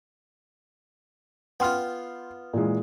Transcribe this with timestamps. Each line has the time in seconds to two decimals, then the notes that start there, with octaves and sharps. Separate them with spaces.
1.60 B3 F4 G5 C6 F6
2.53 A#2 E3 G#3